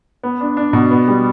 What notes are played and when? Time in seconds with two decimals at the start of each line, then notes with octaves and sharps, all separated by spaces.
0.23 B3
0.41 D4
0.57 D4
0.73 B2
0.91 B3
1.08 G3